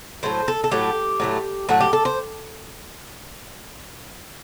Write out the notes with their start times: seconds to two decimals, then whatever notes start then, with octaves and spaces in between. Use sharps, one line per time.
0.23 A2 F#3 A3 C5
0.48 A4
0.64 A4
0.71 A2 F#3 A3 G4
1.20 A2 F#3 A3
1.69 A2 F#3 A3 F#4
1.80 G4
1.93 A4
2.05 C5